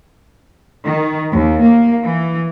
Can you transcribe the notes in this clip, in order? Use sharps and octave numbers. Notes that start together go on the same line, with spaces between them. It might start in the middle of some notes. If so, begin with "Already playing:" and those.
D#3
D#2
A#3
E3